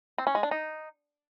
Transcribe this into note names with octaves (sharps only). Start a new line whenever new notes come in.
C4
C#4
G#3
D4
D#4